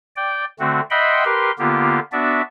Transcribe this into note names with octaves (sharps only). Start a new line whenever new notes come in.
D5 G5
D3 A3 C4 F#4
D#5 E5 F#5 G5 B5 C6
G4 A#4 B4 C6
D3 A#3 B3 F4 G4
B3 D4 F#4 D5 E5